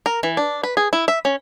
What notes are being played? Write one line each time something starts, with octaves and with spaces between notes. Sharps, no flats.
A#4
E3
D4
B4
G#4
E4
E5
C#4